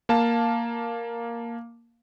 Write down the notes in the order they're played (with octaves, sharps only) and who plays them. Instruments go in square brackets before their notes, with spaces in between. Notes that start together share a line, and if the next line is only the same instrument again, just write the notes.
[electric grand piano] A#3 F5 A5